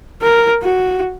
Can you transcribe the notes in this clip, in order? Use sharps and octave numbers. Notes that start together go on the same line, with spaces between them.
A#4
F#4